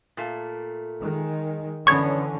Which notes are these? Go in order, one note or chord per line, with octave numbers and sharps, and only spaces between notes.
A#2 A3
D#3 G#3
F#2 D3 E3 B3 C#4 C#5 C#6 G#6